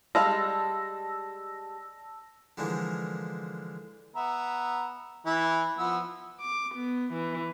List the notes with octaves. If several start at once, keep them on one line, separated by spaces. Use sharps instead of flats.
G3 G#3 F5 A5 E6 A#6
D3 E3 F3 G#3 A#3
B3 E5 A#5
E3 E4
F3 B3 E6
D6
B3
E3